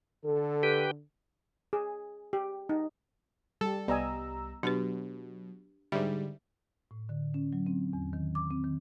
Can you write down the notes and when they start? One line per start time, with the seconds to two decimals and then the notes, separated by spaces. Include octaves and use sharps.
0.25 D3 A4
0.63 G4 B4 G5
1.73 G#4
2.33 G4
2.69 D#4
3.61 G3 G4 A4
3.88 C2 G3 B3 D#5 G#5 A#5 E6
4.63 B2 F#3 D4 G4 B4
5.92 G#2 D3 G3 E5
6.91 A2
7.09 D3
7.34 C#4
7.53 F#3
7.67 C4
7.93 E2
8.13 D#3
8.35 D6
8.51 C4
8.64 D#3